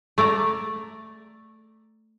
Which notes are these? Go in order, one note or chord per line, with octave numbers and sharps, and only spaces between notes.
A3 D5 A#5